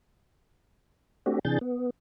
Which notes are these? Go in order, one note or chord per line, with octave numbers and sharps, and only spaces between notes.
A3 C4 D4 F#4 G4
C3 E3 D4 G#4 G6 A6
B3